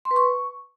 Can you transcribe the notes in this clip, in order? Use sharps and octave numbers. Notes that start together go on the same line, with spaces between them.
C6
B4
C#6